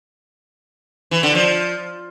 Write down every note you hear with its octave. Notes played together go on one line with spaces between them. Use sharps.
E3
D3
F3